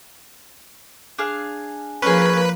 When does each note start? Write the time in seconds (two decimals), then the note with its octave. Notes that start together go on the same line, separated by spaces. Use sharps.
1.18 D4 G#4 F5
2.02 F3 A#3 C#4 G#4 B4